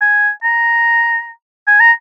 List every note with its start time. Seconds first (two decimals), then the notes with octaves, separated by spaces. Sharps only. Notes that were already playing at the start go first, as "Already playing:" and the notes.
0.01 G#5
0.43 A#5
1.67 G#5
1.80 A#5